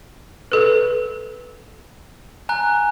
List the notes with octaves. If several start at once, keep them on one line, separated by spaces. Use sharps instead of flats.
A4 B4
G#5 A#5 F#6